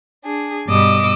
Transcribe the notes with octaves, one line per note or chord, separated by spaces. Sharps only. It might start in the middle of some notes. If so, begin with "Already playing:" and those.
D4 G#4
G2 B2 G3 D#5 D6 E6